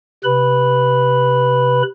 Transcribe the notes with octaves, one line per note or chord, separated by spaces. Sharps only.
C3 B4 B5